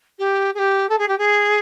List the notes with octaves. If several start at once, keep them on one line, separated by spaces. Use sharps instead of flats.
G4
G#4
G4
A4
G#4
G4
G#4